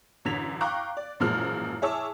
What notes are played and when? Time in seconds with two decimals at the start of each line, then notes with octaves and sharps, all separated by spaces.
0.25 A1 F#2 D3 G#6 B6 F7
0.61 F5 G5 A#5 C#6 D6 F#6
0.97 D5
1.20 A1 F#2 A#2 F3 G#3 F6
1.82 E4 G#4 C#5 A5 D6 E6